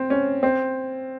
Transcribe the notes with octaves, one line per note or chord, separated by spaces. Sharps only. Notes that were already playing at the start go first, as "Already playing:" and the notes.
Already playing: C4
C#4
C4